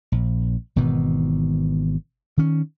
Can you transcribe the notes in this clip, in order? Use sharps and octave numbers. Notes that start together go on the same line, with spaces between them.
A#1
G#1 B2 D#3 E3
D#3 C#4